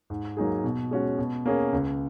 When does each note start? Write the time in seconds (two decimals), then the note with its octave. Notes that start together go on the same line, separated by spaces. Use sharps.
0.10 G#2
0.37 F#3 A#3 D#4 G#4
0.64 B2
0.91 G#3 C#4 F#4
1.19 B2
1.46 A#3 C#4 G#4
1.73 C#2